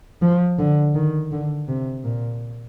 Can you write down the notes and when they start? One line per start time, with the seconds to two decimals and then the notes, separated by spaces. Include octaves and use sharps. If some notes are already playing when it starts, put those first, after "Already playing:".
0.22 F3
0.59 D3
0.95 D#3
1.32 D3
1.68 C3
2.04 A#2